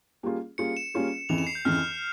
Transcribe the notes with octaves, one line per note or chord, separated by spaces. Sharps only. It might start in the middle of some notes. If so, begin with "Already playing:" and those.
G3 A#3 C#4 F4 G#4
G3 A#3 C#4 F4 G#4 C#7
E7
G3 A#3 C#4 F4 G#4
F2 C#3 E3 F7
E7
C7
G6
F2 C#3 E3 F6